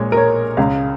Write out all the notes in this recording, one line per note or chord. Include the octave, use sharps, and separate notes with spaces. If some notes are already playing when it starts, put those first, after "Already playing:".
Already playing: A#1 A#2 G#3 C#5
A#4
C#5
C#2 C#3 G#3 F5